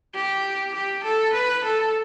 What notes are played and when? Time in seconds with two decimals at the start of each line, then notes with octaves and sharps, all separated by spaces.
0.15 G4
0.74 G4
1.03 A4
1.33 B4
1.64 A4